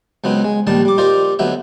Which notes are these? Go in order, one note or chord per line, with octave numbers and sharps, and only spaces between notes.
C#2 F#3 B3 C4 D#4
G#3
A#1 D#2 D#3 G3 A5 D#6
G3 D6
D#4 F4 G4 A#4 C5 D5
D2 F#3 B3 D#4 E5